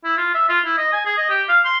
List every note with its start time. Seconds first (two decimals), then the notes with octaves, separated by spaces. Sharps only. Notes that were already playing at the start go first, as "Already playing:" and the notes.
0.04 E4
0.18 F4
0.35 E5
0.49 F4
0.65 E4
0.78 D#5
0.93 G#5
1.05 G#4
1.18 D#5
1.30 G4
1.49 F5
1.65 C6